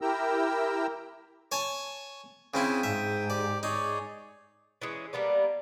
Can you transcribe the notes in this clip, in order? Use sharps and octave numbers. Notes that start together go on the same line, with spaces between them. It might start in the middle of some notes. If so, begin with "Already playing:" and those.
E4 G4 A#4 G5 A#5 E6
C#5 G#5 A5
C#3 C4 E4 G5 D#6
G#2 E5
G4 D5
D#4 G#4 C#5 D5
E3 G#3 C#4
G3 A#3 B3 D4